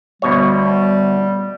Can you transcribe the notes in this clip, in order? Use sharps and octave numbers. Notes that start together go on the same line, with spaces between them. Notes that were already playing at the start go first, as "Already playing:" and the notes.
D2 B2 G3 C#5